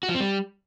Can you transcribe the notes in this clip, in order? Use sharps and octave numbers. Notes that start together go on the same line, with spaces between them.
F#4
F3
C4
G3